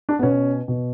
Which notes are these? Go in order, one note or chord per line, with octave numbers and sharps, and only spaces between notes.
D4
B3
B2 C#4
B2